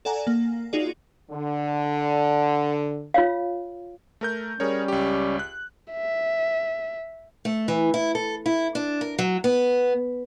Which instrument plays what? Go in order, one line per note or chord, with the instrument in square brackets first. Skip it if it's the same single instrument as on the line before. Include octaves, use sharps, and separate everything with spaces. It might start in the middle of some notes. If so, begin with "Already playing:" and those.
[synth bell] A4 D5 F#5 G#5 A#5
A#3
D#4 F4 F#4 G#4 D5
[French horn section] D3
[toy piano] F4 C#5 F5
[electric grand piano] A3 A#4 G6
[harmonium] G3 C#4 [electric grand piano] G#4 A#4 C#5
[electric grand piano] C#2 G4
F#6
[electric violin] E5
[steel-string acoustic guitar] A3
E3
E4
A4
E4
D4
A#4
F#3
B3